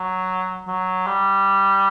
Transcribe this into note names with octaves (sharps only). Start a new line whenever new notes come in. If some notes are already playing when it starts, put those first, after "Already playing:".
Already playing: F#3
F#3
G3